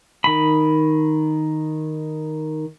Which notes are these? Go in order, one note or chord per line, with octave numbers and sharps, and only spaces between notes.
D#3 B5